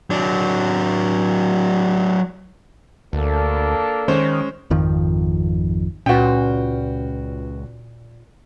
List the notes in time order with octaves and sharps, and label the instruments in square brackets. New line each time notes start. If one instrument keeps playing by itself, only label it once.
[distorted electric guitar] F#3 D4
[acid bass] D2 [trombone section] A#3 D4 A4
[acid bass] D#3 [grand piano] G#3 C#4 C5
[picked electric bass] G#1 F2 D#3 F3
[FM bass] C#2 [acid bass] A#2 [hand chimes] C#4 B4 [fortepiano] F#4 G5